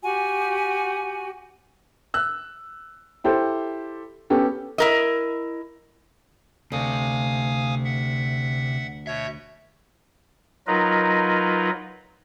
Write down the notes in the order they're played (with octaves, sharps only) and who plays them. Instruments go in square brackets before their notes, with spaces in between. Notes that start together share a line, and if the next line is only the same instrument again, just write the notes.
[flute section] F#4 G4 G#5
[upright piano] E6 F#6
E4 G4 A4 C5
B3 C#4 G4 A4
[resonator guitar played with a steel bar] E4 A#4 D#5
[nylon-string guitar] D2 [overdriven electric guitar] C3 [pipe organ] F5 G#5 D#6
[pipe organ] E5 F#5
[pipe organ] B2 C#5 G#6 [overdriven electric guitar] E5
[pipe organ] F#3 D#4 F4 A#4 B4 D#5